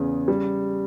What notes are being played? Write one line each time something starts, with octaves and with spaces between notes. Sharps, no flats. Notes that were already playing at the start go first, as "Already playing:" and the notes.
Already playing: E2 C#3
G3